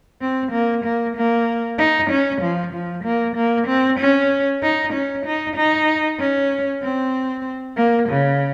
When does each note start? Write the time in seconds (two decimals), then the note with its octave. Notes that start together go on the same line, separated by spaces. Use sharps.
0.21 C4
0.52 A#3
0.84 A#3
1.16 A#3
1.78 D#4
2.10 C#4
2.42 F3
2.73 F3
3.04 A#3
3.36 A#3
3.68 C4
3.99 C#4
4.63 D#4
4.93 C#4
5.26 D#4
5.56 D#4
6.19 C#4
6.82 C4
7.77 A#3
8.09 C#3